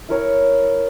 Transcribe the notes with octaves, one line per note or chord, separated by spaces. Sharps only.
E4 A#4 C#5